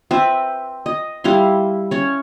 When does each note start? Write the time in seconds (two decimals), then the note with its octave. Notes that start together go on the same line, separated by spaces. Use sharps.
0.11 C4 B4 E5
0.86 D#5
1.24 G3 E4 F5 C6
1.91 C#4 C#5